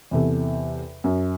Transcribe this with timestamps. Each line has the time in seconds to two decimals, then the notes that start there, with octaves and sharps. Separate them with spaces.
0.11 E2 C3 A4
1.04 F#2